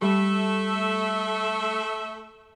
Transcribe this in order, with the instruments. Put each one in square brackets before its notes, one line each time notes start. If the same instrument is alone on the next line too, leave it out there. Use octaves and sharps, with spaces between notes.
[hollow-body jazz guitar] G3 [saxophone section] A3 E5